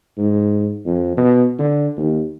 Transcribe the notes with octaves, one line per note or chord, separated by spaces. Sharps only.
G#2
F2
B2
D3
D#2